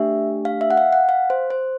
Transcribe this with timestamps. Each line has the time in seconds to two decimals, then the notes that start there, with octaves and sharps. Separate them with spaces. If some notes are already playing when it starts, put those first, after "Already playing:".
Already playing: A3 D4 G4 E5
0.45 F5
0.61 E5
0.71 F#5
0.77 F5
0.93 F#5
1.09 F5
1.30 C5
1.50 C5